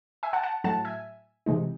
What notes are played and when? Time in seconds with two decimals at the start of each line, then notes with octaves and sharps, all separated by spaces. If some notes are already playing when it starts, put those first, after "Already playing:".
0.23 E5 G#5
0.33 F#5 A5
0.43 F#5 A5
0.64 A2 F#3 A3 F#5 A5
0.85 E5 G#5
1.46 C3 E3 G#3 D#4